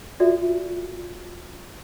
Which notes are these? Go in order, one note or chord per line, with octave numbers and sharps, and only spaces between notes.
F4 F#4 A4 D5 E5